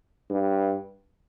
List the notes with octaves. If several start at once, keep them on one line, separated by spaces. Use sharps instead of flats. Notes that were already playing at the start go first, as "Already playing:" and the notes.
G2